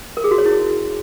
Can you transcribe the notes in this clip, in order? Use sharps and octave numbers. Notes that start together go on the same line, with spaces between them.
A#4
G#4
F#4
C#5
E4